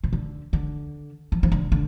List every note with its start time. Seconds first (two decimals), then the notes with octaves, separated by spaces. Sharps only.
0.04 C3
0.13 D3
0.53 D3
1.32 F3
1.43 F3
1.52 D3
1.72 D3